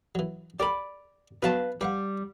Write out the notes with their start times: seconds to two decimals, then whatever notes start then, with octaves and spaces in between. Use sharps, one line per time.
0.15 E3 F#3
0.60 G4 A#4 D5 A#5 B5
1.43 B2 F#3 B4 F5 A5
1.81 G3 B4 F5 F#5